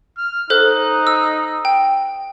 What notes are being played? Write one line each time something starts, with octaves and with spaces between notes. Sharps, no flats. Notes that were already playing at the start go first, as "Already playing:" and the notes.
F6
D#4 A4 C5 F#6
E6
G5